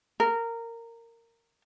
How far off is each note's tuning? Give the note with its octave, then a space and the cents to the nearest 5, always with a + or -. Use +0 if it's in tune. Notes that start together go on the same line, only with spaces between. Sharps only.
A#4 -15